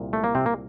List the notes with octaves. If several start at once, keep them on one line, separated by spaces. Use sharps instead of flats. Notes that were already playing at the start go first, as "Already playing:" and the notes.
Already playing: C2 A#2
A3
A#3
C3 C4
A#3